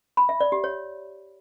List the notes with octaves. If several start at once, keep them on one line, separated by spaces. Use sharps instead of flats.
B5
E5
D5
G4
C#5